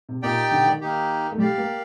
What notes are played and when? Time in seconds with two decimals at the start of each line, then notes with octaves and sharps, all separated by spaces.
0.09 C3
0.22 A#2 D#4 G4 D5 G5
0.51 D3
0.66 D#3
0.81 A#3 D#4 G4
1.32 A3
1.38 G3 G4 D5 F5
1.58 A#3